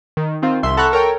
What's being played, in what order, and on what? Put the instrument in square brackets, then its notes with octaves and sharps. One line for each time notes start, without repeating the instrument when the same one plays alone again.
[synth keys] D#3
D#3 C4 F4
C2 E5 C6
A4 F#5 A#5 B5 C#6 F#6
A4 A#4 C#5 G5